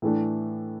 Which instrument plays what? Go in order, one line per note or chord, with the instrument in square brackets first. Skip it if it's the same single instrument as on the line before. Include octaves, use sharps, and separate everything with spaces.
[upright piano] A2 E3 A3 D4